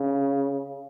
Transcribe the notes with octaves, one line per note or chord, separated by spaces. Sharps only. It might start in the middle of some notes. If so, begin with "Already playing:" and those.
Already playing: C#3